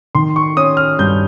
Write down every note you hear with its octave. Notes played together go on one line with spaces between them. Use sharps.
D#3 C6
C#6
C#4 D#6
F6
G2 G6